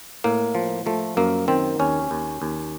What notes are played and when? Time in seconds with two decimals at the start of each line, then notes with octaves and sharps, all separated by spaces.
0.24 A2 A#3
0.55 F3
0.86 F3 A3
1.17 F#2 A#3
1.48 D#3 C4
1.80 D#2 C#4
2.11 D#2
2.42 D#2